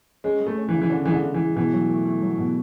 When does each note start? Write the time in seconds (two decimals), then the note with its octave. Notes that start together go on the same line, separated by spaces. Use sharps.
0.24 G#3 C#4
0.40 G#3
0.46 A3
0.57 C#4
0.69 E3
0.74 C#3
0.81 E3
0.90 D3 C#4
1.05 E3 G#3
1.12 D3
1.23 C#3
1.34 E3
1.40 G#3
1.55 B2 E3
1.73 F#3
1.89 A3
2.05 A3
2.22 F#3
2.38 B2